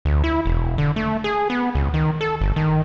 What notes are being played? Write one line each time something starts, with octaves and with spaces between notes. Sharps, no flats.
D2
E4
E1
D3
A3
G#4
B3
C#2
D#3
A4
G1
D#3